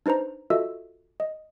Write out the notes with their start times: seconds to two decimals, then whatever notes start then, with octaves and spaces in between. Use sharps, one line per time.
0.06 D4 D#4 B4 C5 A#5
0.50 F4 F#4 A4 D#5 E5 E6
1.20 D#5